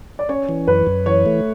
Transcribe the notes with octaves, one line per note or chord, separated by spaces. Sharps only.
D5
C#4 C#5
E3
F#2 B4
F#2
E3 C#5
A3